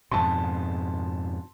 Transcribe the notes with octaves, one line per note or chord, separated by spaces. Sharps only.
F2 G#2 B2 A5 C6